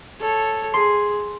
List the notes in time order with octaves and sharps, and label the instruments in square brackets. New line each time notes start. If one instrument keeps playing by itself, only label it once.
[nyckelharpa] A4 C#5
[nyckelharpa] G#4 [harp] C6